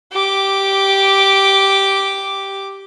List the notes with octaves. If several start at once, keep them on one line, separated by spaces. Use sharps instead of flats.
G4 D6